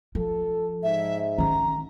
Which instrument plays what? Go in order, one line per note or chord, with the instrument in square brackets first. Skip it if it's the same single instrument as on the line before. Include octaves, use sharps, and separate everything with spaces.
[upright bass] F3 [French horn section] A4
[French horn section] G#2 [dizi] E5
[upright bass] D#3 C#4 [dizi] A#5